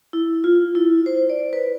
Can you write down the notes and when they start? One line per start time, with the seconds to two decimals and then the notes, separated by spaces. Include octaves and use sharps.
0.13 E4
0.44 F4
0.75 E4
1.06 C5
1.30 D5
1.53 B4